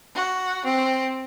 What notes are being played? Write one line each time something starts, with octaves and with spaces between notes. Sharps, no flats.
F#4
C4